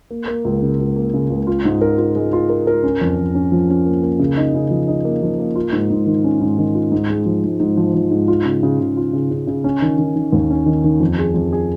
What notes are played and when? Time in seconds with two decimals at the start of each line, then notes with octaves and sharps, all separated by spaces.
0.11 A#3
0.28 A#3
0.45 C#2
0.62 C#3
0.79 C#2
0.96 A#3
1.14 C#3
1.30 C#2
1.47 F4
1.65 G#2
1.81 A#4
1.98 F4
2.16 G#3
2.33 F4
2.50 A#4
2.67 A#4
2.83 C#4
3.01 F2
3.18 F2
3.35 C#4
3.52 F3
3.69 C#4
3.86 A#3
4.03 A#3
4.19 C#3
4.37 D#4
4.54 C#3
4.70 F3
4.88 D#4
5.05 A#3
5.23 F3
5.39 A#3
5.56 F4
5.72 G#2
5.90 G#2
6.06 D#3
6.24 C#4
6.41 G#2
6.58 D#3
6.75 F4
6.92 G#2
7.10 G#3
7.26 F3
7.44 G#2
7.60 G#2
7.77 F3
7.94 F3
8.11 G#2
8.28 F4
8.45 C#3
8.63 C#3
8.80 C#3
8.97 F4
9.13 C#3
9.31 C#3
9.47 C#3
9.64 C#4
9.82 D#3
9.99 D#3
10.16 D#3
10.32 D#2
10.50 C#4
10.66 D#3
10.84 D#3
11.00 F2
11.19 G#4
11.34 F2
11.53 G#4